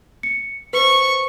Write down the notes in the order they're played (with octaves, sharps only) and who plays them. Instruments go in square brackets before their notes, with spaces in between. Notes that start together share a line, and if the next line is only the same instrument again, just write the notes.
[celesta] C#7
[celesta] B4 C5 [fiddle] C#6